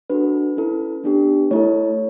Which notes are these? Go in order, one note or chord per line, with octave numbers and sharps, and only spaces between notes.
D4 F#4 A4 B4
C#4 E4 A4
B3 D4 G4
A3 E4 A4 C#5